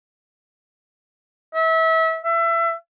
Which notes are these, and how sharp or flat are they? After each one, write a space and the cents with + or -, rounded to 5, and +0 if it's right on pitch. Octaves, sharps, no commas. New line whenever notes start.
E5 -30
E5 +25